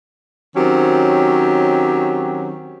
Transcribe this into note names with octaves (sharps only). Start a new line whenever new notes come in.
D#3 F#3 C4 C#4 G4